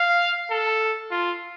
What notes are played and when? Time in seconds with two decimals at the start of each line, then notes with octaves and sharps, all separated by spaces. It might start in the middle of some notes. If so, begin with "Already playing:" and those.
Already playing: F5
0.51 A4
1.11 F4